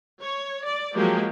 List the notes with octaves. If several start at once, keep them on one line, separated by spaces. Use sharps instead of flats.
C#5
D5
F3 F#3 G#3 A#3 G4